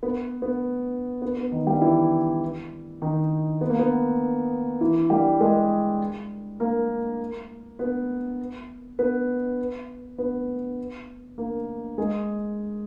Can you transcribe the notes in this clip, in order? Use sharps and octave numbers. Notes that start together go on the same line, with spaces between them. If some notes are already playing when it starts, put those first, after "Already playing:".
B3 B4
B3
B3
B3
D#3 D#4
G3 G4
E3 E4
D#3 D#4
B3
A#3
B3
E3 E4
G3 G4
G#3 G#4
A#3 A#4
B3 B4
B3 B4
B3 B4
A#3 A#4
G#3 G#4